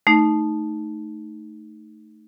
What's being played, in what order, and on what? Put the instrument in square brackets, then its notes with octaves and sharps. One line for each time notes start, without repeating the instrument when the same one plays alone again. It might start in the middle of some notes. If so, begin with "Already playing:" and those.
[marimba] A3 D#4